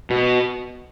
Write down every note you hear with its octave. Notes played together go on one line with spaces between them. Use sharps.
B2